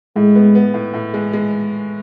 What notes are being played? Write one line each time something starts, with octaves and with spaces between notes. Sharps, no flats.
A2 G#3
B3
B3
A2
A2
G#3
G#3